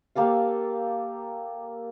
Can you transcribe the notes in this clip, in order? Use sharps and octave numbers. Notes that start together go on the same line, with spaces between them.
A#3 G4 A4 F5